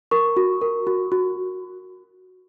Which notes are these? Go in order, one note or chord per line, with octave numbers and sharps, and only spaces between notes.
A#4 C#6
F#4
A#4
F#4
F#4